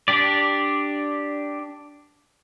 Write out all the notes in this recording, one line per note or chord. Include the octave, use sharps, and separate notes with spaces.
D4 G4 D5